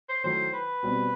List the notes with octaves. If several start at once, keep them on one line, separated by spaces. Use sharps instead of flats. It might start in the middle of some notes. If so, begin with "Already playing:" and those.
C5
D#3 F#3 A3 E4 C5
B4
B2 G3 C4